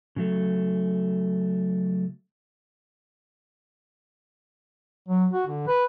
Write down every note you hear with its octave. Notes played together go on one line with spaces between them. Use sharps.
C#3 F#3 A3
F#3
F#4
D3
B4